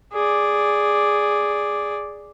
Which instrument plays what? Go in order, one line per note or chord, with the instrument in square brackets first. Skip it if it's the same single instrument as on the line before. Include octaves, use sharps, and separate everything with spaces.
[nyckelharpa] G#4 D5